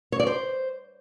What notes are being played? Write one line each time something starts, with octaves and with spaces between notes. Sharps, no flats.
C#5
D5
C5